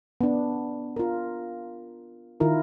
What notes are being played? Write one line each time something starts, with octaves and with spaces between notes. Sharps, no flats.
B3 D4
F4 A#4
D#3 E4 F4 A#4